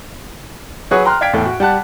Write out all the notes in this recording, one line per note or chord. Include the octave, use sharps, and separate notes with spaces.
F#3 F#4 G#4 B4 C#5
G5 A#5 C6 F6 F#6
D5 F5 G5 G#6 B6 D7
E2 A2 A4
F#4
G3 F#5 A5 F#6